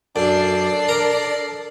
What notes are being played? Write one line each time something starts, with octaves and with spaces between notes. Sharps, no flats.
F#2 D4 A4 D5 C7
A#4 A#5